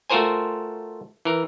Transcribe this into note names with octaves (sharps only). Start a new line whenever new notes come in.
A3 F4 F#4 A#4 C5 G#5
E3 A#4